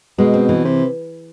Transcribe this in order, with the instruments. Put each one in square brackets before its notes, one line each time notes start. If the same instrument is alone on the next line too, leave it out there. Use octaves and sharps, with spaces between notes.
[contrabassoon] B2 [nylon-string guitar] G#3
[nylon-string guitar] C4
E3
[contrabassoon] C3